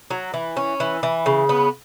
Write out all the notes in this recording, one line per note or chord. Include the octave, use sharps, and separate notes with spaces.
F#3
E3
C#4
E3
E3
C#3
B3